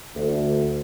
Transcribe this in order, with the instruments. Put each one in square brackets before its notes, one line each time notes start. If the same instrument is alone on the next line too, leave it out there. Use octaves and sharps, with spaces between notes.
[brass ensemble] D2